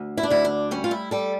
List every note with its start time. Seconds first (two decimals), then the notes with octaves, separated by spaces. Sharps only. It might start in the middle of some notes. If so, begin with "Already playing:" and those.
Already playing: D2
0.17 E4
0.23 D4
0.30 D2 E4
0.45 D4
0.71 G3 C#4
0.84 F4
0.91 E4
1.11 G3 A4